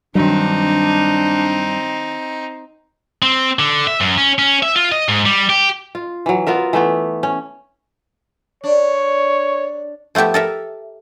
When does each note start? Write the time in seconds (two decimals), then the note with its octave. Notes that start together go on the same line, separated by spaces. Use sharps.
0.15 G2 D#3 F#3 C4 D4 D#4
3.23 C4
3.59 D3
3.87 E5
4.01 F#2
4.18 C#4
4.39 C#4
4.63 E5
4.76 F4
4.92 D#5
5.08 G#2
5.25 G3
5.49 G4
5.95 F4
6.26 E3 F#3
6.47 B3 F4 A#4 E5
6.73 E3 A3 B3
7.23 C#4
8.64 D4 C#5
10.15 F3 A3 B3 G4 E5
10.34 A4 A#4 E5